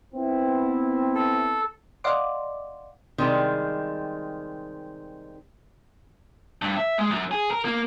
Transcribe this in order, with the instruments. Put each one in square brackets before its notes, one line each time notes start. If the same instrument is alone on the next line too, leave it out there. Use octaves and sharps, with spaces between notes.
[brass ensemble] B3 C4 E4
[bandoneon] A4
[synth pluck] D5 D#5 F5 F#5 C6 D6
[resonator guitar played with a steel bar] C3 D#3 G3 G#3
[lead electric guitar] G2
E5
G#3
F#2
G#4
A#4
A#3